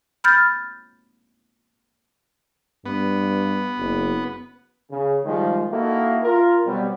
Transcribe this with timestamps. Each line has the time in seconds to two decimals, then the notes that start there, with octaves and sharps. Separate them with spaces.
0.24 B5 F6 G6 A6
2.86 G2 B3
3.78 F#1
4.91 C#3
5.24 D#3 F3 G3 G#3
5.70 A#3 D#4 E4 F#4 A4
6.24 F4 A#4
6.65 B2 F#3 G3 B3 C4